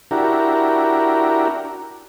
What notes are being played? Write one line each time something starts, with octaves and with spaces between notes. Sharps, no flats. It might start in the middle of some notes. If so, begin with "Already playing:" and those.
D4 E4 F#4 G4 A#4